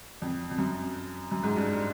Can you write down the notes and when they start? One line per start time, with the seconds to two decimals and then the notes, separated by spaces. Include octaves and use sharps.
0.22 F2
0.51 F2
0.58 F#2
1.31 F#2
1.43 G#2
1.56 G2